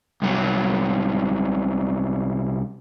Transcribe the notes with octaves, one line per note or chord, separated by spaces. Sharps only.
C2 F#3